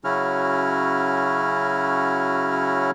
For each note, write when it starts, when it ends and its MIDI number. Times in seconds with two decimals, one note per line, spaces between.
0.04 2.91 49
0.04 2.91 54
0.04 2.91 61
0.04 2.91 64
0.04 2.91 66
0.04 2.91 89